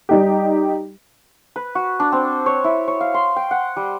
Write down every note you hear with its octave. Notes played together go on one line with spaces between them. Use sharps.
G3 D#4 G4
B4
F#4
D4
C4
C#5
E4
C#5
F5
C6
G5
F#5
G3